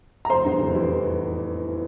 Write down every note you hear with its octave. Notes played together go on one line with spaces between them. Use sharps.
A#5
F1 C5 C6
E2 E3 G3
F1
E3 G3